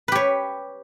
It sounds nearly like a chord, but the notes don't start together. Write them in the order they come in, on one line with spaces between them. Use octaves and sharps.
B4 G4 C#5